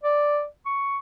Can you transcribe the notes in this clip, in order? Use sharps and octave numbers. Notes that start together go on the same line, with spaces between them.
D5
C#6